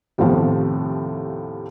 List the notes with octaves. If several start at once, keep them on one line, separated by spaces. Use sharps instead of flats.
D#2 A2 C3 F3 B3